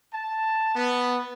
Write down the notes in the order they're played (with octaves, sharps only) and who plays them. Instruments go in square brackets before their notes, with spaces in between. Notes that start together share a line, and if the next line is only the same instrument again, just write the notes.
[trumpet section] A5
B3